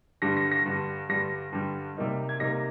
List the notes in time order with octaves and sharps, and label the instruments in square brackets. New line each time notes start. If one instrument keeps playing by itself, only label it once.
[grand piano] G2 D3 G3 A#6
A#6
A#6
G2 D3 G3
G2 D3 G3 A#6
G2 D3 G3
C3 G3 A#3 D#4
G#6
C3 G3 A#3 D#4 A#6